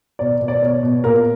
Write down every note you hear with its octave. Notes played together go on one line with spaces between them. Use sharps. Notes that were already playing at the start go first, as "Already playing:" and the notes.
B2 D5
B2
D5
B2 C#5
B2
A#2 A#4